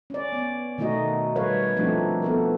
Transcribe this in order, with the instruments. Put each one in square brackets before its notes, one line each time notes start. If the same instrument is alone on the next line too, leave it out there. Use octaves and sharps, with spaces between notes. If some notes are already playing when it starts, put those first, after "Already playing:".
[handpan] C#4 D5
B3
B2 D#3 A3 D#4 F#4 D#5
G3 A#4 B4 C#5 F5
F3 A3 C4 D4 D#4 F#4
B3 A4 A#4